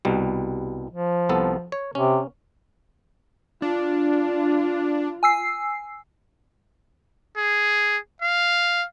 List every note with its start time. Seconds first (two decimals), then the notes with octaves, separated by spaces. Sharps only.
0.05 C2 B2 G3
0.90 F3
1.29 C2 B3 A4
1.72 C#5
1.95 C3 C#4
3.62 D4 F4
5.23 G#5 E6 C7
7.37 G#4
8.22 F5